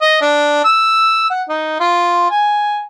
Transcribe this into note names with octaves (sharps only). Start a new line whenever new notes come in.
D#5
D4
E6
F#5
D#4
F4
G#5